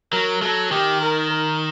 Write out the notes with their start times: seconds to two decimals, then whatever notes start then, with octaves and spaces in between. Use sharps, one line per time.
0.12 F#3 A#4
0.42 F#3 A4
0.71 D#3 G4
1.01 A#4
1.31 A#4